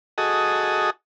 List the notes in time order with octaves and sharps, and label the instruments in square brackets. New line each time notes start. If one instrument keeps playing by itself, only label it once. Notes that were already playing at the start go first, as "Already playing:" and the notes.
[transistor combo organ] F#4 G#4 A4 D#5